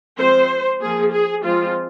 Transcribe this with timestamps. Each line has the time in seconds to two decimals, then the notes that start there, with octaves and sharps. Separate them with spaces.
0.18 F3 G#3 C4 C5
0.80 F3 A#3 G#4
1.12 G#4
1.44 F3 G#3 C4 F4